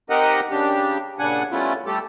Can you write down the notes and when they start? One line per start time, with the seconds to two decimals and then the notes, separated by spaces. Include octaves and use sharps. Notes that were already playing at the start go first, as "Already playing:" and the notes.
0.10 C4 D#4 G4 A#4 D#5 F#5
0.51 C#3 D4 G4
1.19 A#2 C#3 D4 F#5 G#5
1.51 G3 A3 B3 C#4 E4 F4
1.86 G3 A3 G4 A4